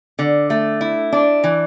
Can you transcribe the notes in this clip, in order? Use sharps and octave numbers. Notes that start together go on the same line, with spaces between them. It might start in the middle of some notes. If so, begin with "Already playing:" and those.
D3
A3
E4
D4
E3